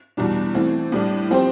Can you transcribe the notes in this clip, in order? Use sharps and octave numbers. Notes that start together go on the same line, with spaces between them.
E2 B2 G3 D4
E3 A3 C4
A2 G3 D4
F3 C4 G4 C5